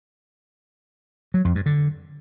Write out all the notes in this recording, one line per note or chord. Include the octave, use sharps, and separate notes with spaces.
F#3
F2
G2
D3